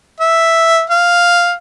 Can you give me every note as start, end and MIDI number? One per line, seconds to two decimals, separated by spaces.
0.20 0.83 76
0.90 1.53 77